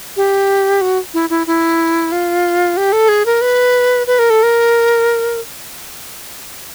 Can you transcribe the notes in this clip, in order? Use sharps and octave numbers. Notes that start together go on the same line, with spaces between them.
G4
F#4
E4
E4
E4
F4
G4
A4
G#4
A#4
B4
B4
A#4
A4
A#4